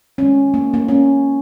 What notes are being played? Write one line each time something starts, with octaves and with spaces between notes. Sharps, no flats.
D#3 G#3 C#4
A#3
A#3
C#4